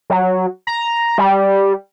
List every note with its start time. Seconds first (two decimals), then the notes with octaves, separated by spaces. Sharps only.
0.10 F#3
0.67 A#5
1.18 G3